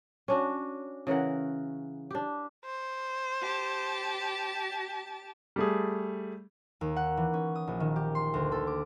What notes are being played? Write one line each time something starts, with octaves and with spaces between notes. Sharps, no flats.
C#4 D4 F#4
C#3 E3 A#4 F#5
D4 G4
C5
G4 A5
G3 A3 G#4
D#2
F#5
E3
C#4
D#6
A#1
D#3
G4
C6
D2
A4
D6